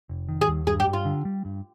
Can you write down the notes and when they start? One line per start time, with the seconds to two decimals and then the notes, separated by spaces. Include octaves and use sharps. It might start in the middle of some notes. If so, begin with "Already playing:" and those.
0.09 F1
0.29 D#3
0.41 G#4
0.48 D#2
0.67 G2 G#4
0.80 G4
0.87 G2
0.93 F4
1.05 D3
1.25 G3
1.45 G2